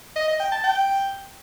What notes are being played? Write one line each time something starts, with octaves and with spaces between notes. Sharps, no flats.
D#5
D#5
G5
A5
G5